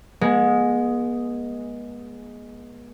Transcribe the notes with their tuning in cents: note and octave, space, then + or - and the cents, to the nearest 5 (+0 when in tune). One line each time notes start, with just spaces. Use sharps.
G#3 +0 B3 -40